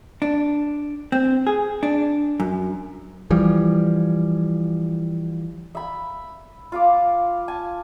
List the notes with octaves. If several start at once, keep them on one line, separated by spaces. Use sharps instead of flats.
D4
C4
G#4
D4
F#2
E3 F3 G3
E5 B5
F4 F5 D6
G#5 A5